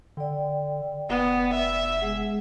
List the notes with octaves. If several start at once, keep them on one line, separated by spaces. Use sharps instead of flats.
D3 D5 G5
F1 B3
E5
G#3 G#4 F#5